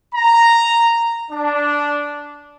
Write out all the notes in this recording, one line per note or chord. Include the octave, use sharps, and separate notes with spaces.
A#5
D4